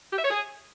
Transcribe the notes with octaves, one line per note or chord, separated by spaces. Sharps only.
G4
E5
C#5
G#4